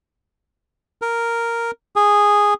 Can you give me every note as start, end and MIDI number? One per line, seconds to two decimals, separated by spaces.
1.02 1.71 70
1.96 2.54 68